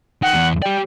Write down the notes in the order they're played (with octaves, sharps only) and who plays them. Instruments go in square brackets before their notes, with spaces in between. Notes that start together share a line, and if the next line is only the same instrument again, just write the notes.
[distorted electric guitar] D#4 G5 [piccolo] F#5
[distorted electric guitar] E2
[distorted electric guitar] G4 D5 [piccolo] G5